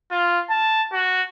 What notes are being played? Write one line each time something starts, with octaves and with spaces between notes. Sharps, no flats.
F4
A5
F#4